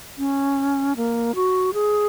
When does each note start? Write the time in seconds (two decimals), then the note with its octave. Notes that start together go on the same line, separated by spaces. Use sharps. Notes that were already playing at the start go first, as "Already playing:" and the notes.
0.18 C#4
0.96 A#3
1.35 F#4
1.74 G#4